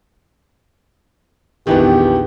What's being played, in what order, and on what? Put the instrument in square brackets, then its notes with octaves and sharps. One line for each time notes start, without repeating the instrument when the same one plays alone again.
[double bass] A#1 E2 [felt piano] D#3 E3 B3 [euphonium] G4